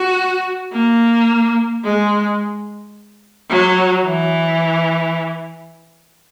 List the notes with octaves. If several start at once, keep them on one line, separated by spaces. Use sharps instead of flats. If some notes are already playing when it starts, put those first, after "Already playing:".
Already playing: F#4
A#3
G#3
F#3
E3